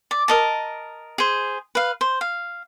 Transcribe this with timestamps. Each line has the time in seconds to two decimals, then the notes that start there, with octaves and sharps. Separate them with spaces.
0.11 D5
0.28 A#4 D#5 A5
1.18 G#4 C5
1.75 B4 F5
2.01 C5
2.21 F5